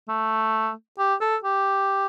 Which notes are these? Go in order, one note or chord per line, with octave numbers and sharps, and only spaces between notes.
A3
G4
A4
G4